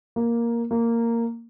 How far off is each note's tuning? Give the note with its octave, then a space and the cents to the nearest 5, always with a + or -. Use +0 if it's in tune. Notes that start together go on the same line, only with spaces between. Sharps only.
A#3 +5
A#3 -10